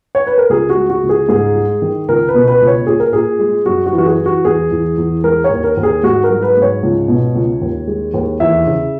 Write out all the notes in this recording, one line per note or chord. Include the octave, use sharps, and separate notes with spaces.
C#5
B4
A#4
C#2 G#4
F#4
G#3
F#4
C#2
G#4
G#2 G#4
G#3
D#3
C#2 A#4
B4
B2
B4
C#2
C#5
A#2 G#4
A#4
A#2 G#4
G#3
F#2 F#4
F#4
E3
F#4
G#4
E3
F#4
E2 G#4
E2
E2
G#3 A#4
C#5
D#2
A#4
D#2
G#4
G#2 F#4
A#4
F#3
B4
G#2
C#5
C#2
B2
C#2
D#2
G#3
D#2
E2 E5
C#3